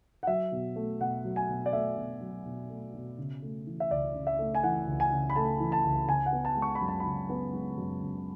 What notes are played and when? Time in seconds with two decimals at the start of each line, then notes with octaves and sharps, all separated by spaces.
0.23 F#5
0.27 F#3 E5
0.52 B2
0.76 A3
1.00 B2 F#5
1.25 F#3
1.36 G#5
1.49 B2
1.66 D5
1.73 A3 E5
1.97 B2
2.21 F#3
2.45 B2
2.70 A3
2.94 B2
3.18 C#3
3.42 A3
3.67 E3
3.80 E5
3.91 C#2 D5
4.15 C#3
4.27 E5
4.39 A3
4.55 G#5
4.63 E3 F#5
4.87 C#2
5.00 G#5
5.12 C#3
5.30 B5
5.36 A3 A5
5.60 E3
5.72 A5
5.84 C#2
6.08 C#3 G#5
6.26 F#5
6.33 B3
6.45 A5
6.57 G#3
6.62 C#6
6.75 B5
6.81 F#2
6.88 A5
7.00 C#3 B5
7.29 B3
7.54 G#3
7.78 F#2
8.02 C#3